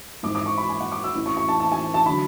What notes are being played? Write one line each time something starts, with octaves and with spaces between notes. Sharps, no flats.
G#1 G#2 E3 D6
D6
C#6
B5
G#5
F#5
D6
E6
A1 A2 E3
C#6
C#6
A5
A5
G#5
A5
D3 F#3 B5